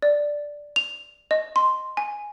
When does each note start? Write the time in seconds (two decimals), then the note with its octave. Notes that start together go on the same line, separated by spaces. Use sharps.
0.02 D5
0.76 F7
1.31 D#5
1.56 C6
1.97 G#5